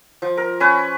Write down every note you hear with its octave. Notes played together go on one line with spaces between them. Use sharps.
F3
A#4
C#4 B4